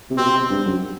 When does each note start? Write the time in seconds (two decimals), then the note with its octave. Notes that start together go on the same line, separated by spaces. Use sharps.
0.10 C3
0.17 B2 C4
0.33 C3
0.50 G2
0.65 F#2